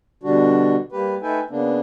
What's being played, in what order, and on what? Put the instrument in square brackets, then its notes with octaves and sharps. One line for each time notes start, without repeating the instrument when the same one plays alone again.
[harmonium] B2 D3 G3 D4 F#4
G3 A#3 G4 B4
A3 D#4 A4 B4 G5 G#5
C#3 A#3 B3 D4